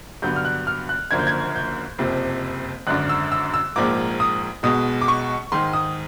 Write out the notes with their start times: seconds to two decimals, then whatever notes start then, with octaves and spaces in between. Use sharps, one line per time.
0.22 G2 D3 F#3 B3 G6
0.36 F6
0.45 F#6
0.67 F6
0.89 F#6
1.11 F#1 F#2 D3 F3 A#3 G#6
1.19 G6
1.27 G#6
1.56 G6
1.99 F#1 F2 C3 F3
2.87 G#1 F#2 D3 F#6
3.09 E6
3.32 E6
3.54 E6
3.76 A#1 G#2 F3 A#3 D6
4.20 D#6
4.63 B1 B2 G#3 D#6
5.01 D6
5.08 C#6
5.52 G#2 D#3 G#3 C6
5.73 D#6